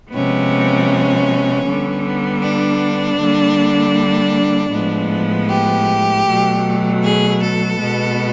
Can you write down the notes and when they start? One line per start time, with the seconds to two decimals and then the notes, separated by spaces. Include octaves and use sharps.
0.11 C3 F3 G#3 B3 C#4
1.65 D3 G3 B3
2.42 D4
3.18 D3 G3 A#3
4.71 A2 F3 G#3 B3
5.48 G4
6.26 B2 F#3 A3
7.02 G#4
7.40 A4
7.79 B2 G#3 B3